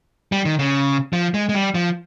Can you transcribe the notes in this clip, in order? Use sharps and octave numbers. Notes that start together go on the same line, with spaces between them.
G3
D#3
C#3
F3
G#3
G#3
G3
F3